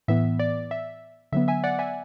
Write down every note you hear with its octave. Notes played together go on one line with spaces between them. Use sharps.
A2 E3 B3 E5
D5
E5
D3 F#3 B3 E5
E5 G#5
D5 F#5
E5 G#5